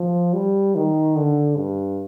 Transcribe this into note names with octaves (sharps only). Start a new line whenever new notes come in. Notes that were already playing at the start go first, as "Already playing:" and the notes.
Already playing: F3
G3
D#3
D3
G2